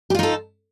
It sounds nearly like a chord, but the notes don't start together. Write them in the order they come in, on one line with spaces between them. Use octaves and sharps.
G4 F4 D#4 A4